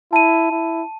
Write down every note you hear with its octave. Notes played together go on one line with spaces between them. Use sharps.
E4 A5 D#7
E4